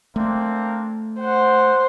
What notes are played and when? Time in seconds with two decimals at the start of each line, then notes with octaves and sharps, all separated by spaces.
0.16 A3 A#3 C4 D4
1.20 C5 F#5